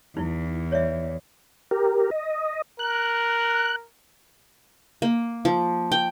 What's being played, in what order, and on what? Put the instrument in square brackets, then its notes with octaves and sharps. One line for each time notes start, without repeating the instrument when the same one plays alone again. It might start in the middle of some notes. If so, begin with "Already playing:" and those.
[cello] E2 [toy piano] D#4 E4
[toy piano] C#5 D5 E5
[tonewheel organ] G4 A#4
D#5
[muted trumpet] A#4 [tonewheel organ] F#6
[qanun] A#3
F3
G5